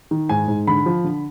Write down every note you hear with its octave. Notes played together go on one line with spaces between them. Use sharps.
D#3
G#2 G#5
G#2
D3 B5
F3
D3